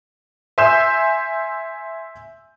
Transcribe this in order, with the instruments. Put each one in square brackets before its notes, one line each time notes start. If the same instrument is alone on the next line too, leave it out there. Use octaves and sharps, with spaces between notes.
[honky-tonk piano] E5 G#5 C6 E6 G6 E7